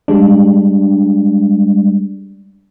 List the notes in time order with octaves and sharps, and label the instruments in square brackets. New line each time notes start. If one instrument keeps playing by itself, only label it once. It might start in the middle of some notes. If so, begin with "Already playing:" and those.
[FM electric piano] G3 G#3 D4